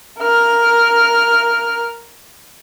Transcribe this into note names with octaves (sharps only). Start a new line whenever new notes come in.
A#4 F6